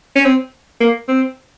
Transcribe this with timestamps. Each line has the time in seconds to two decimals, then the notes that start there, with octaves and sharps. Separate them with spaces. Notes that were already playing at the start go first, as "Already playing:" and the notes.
0.16 C#4
0.25 C4
0.80 A#3
1.08 C4